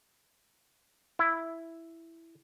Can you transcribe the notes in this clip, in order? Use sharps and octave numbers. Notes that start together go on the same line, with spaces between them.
E4